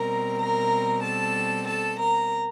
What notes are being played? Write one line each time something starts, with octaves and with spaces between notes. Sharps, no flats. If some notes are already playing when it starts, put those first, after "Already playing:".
Already playing: B2 G3 C4 A#4 A#5
A#4 A#5
A4 A5
A4 A5
A#4 A#5